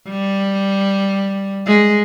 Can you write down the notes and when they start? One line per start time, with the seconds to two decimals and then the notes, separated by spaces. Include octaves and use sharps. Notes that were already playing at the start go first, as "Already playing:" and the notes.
0.09 G3
1.67 G#3